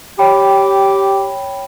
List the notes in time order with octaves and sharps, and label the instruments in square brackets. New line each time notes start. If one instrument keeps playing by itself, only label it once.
[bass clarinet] G4 [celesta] C#5 G5 B5